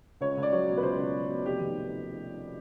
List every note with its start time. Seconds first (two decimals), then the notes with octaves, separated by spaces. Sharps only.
0.21 C#2 C#5
0.37 C#2
0.43 D5
0.52 F#3 C#5
0.68 B2
0.78 B4
0.83 C#2 C5
0.98 C#2
1.15 F#3
1.30 B2
1.45 F1 G4
1.60 D#3